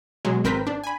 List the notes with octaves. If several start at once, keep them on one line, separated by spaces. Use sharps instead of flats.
B2 F#3 G#3
G#1 C4 A#4 B4 G6 B6
D4
G#5 B5